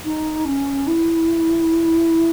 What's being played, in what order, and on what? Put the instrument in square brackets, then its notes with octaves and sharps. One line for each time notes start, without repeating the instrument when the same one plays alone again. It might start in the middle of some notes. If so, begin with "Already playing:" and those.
[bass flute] D#4
C#4
E4